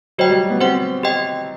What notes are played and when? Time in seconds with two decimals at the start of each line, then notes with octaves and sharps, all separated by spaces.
0.18 F#3 F#4 C5 D#5 G5
0.29 G3
0.50 B3
0.61 C4 G4 C5 F#5
1.03 G4 D#5 G5